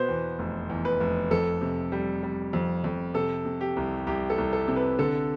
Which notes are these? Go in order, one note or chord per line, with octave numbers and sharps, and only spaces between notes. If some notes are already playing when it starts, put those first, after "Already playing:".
Already playing: B2 B3 B4 C5
E2
F1
E2
B4
F1
F2 A4
C3
G3
G3
F2
F2
C3 A4
C3
G4
C2
C2 G4
A4
C2
A4
C3
B4
D3 A4